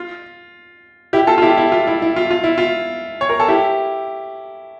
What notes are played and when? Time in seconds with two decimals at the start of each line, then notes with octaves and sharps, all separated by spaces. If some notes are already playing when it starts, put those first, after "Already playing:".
Already playing: F4
1.13 E4 G4
1.27 F4 A4
1.38 F4
1.42 E4 G4
1.58 E4
1.72 F4
1.87 E4
2.02 E4
2.16 F4
2.31 F4
2.44 E4
2.58 F4
3.21 C#5
3.30 A#4
3.40 A4
3.48 E4 G4